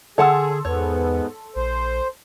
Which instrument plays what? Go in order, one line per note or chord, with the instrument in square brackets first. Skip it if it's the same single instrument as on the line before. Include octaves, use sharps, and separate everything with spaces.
[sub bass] D3 [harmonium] G#4 [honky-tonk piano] A4 C6 E6 [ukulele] C#5 F#5 A5
[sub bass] E2 [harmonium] G#2 B3 [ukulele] C#5
[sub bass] A#1 [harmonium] C5